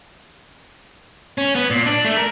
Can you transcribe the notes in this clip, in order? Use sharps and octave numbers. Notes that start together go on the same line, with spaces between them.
C#4
B3
A#2
D4
A3
A#4